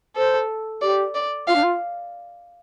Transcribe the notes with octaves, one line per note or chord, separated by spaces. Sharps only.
A4 C5
G4 D5
D5
F4 F5
D4
F4